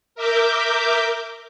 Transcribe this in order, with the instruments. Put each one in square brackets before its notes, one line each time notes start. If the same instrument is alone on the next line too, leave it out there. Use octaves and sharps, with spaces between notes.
[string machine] A#4 E5 D6 G6